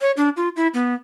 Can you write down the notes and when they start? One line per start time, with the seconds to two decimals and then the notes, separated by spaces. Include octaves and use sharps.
0.01 C#5
0.17 D4
0.37 F4
0.56 E4
0.74 B3